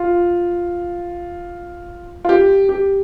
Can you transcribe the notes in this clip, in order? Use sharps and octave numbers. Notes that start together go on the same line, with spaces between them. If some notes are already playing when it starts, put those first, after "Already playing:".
Already playing: F4
F4
G4
G4